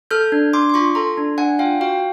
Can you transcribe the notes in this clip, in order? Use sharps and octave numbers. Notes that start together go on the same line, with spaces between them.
A4 F6 G6
D4
D4 C6 D6
C6
F4 B5 C#6
A4 A#5 C6
D4
D4 F#5 G#5
F4 F5 G5
F#4 F5 G5